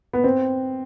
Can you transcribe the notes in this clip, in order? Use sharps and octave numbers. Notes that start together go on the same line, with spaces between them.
B3
C4